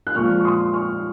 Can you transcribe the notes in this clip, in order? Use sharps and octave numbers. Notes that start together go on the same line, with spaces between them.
F#6
A#2 F3 G#3 C#6 F6
C#6
C6 D#6
C#6 F6